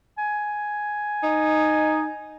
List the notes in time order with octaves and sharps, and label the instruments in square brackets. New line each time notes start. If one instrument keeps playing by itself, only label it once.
[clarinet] G#5
[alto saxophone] D#4